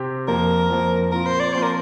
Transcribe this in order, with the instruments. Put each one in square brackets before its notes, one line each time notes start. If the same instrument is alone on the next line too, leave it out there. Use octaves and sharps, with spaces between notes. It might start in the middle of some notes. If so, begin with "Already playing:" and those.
Already playing: [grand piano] C3 C4 G4
[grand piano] F2 F3 A#3 [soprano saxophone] A#4
[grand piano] F2 F3 A#3
[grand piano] A#2 F3 C4 F4 [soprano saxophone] A#4
[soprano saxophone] C5
D5
[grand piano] A#2 F3 C4 F4 [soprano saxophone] C5
[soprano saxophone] A#4